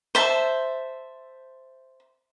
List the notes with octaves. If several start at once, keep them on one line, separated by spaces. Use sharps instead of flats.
C5 E5 A5